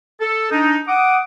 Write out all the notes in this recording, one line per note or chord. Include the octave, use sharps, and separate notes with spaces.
A4
D4 D#4
F#5 D6 D#6